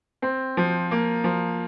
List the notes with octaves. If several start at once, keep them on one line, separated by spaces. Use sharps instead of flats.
C4
F3
A#3
F3